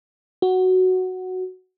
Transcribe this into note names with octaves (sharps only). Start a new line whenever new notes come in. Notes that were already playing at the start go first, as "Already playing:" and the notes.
F#4